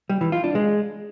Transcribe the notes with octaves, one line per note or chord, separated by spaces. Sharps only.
G3
E3
F4
D4
G#3